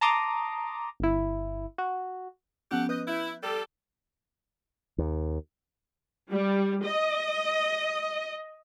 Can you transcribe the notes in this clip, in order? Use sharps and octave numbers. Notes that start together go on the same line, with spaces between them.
A5 A#5 C6 D6 D#6
G1 E4
F#4
F3 B3 C#4 G4 A4 F#5
B4 D#5 F#6 G6
E4
G3 G4 A4 E6
D#2
G3
D#5